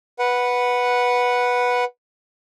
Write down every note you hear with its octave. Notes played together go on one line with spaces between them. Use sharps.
B4 F#5